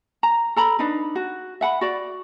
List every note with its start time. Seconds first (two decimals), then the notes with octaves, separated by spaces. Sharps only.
0.23 A#5
0.56 A4 A#5 B5
0.79 D4 D#4 B4
1.15 F#4
1.61 E5 F#5 B5
1.81 F#4 D5